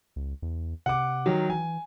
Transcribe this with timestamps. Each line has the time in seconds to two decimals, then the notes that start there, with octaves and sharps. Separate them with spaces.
0.16 C#2
0.42 E2
0.86 C3 F#5 D6
1.26 D#3 F#3
1.50 E3 G#5